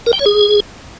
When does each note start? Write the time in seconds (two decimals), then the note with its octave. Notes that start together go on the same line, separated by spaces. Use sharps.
0.06 A#4
0.13 G5
0.19 C#5
0.26 G#4